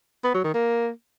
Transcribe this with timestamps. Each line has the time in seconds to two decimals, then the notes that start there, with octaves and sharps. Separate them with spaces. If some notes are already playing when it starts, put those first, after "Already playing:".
0.24 B3
0.34 F#3
0.44 D#3
0.54 A#3